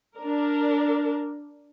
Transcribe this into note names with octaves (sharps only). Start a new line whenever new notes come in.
D4 A#4